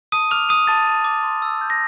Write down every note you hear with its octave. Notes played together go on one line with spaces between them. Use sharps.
A5 D#6 D#7
D6 F6 F7
D#6 F6 D#7
A5 A6
A5
D6
C6
E6
G6
A#6